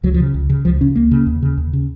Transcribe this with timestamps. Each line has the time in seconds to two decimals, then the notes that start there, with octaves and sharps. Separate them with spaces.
0.03 C#2 F#3
0.14 F3
0.20 C#3
0.34 C#2
0.50 C#3
0.65 C#2 F3
0.81 C#3 C#4
0.96 C#2 A#3
1.11 C#3
1.26 D#2
1.42 C#3
1.57 D#2
1.73 C#3